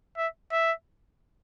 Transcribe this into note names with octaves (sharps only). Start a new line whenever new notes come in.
E5
E5